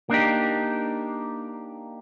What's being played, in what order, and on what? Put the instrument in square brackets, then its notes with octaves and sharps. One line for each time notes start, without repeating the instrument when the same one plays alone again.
[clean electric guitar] A#3 D4 D#4 G4